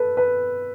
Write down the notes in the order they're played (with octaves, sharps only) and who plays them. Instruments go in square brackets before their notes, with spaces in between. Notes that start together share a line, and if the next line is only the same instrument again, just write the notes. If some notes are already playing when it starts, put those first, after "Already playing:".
Already playing: [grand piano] A4 B4
B4